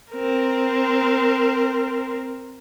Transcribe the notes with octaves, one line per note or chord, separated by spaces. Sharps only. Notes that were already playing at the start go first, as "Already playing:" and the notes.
C4 A#4